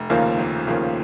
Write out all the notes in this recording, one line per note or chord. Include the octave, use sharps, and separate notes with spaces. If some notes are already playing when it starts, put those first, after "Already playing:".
Already playing: F1
D#2 C#3 F3 A#3
F1
D#2 C#3 F3 A#3